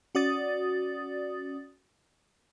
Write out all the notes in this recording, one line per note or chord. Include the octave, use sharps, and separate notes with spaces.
C#4 F#4 D5 D#6 A6